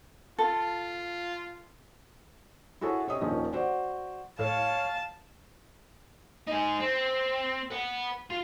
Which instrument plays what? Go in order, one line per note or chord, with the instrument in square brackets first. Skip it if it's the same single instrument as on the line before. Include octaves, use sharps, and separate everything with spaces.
[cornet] F4 [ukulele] A4
[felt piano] E4 F#4 G#4 A4 C#5
C3 C#5 D#5 D#6
D#1 D#3 F3 C#4
F#4 C5 D5 F#5
[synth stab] A2 [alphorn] C#5 [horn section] F5 [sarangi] A5
[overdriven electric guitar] D#4 G#4
C4
B4 F#5
F4